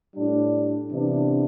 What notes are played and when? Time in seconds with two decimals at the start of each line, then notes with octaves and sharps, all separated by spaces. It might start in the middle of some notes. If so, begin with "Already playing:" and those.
0.15 A2 G3 D4
0.91 C3 E3 B3 D4